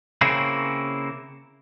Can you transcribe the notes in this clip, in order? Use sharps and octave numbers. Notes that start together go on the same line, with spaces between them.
C#3 A#3 C4 C#4 E4